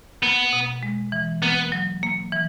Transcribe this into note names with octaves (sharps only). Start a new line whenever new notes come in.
A#3 B3
B2
G#3
E3
A#3 B3
F#3
A#3
E3